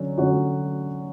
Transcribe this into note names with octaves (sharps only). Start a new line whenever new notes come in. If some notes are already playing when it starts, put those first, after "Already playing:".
Already playing: D3 F#3 C#4
D3 F#3 C#4 F#4